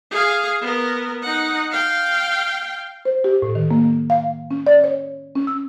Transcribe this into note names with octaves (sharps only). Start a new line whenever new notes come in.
G#4 F5
B3 A#4
D#4 F#5
F5 G5
C5
G4
A2
D#3
A#3
F5
C#4
D5
C#5
C#4
E6